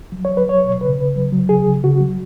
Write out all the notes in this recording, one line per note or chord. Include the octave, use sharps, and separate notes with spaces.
F#3
F#3 C#5
B4
F#3 C#5
B2
C#3 B4
C#3
F#3
F#3
C#3 G#4
C#3
C#3 F#4
F#3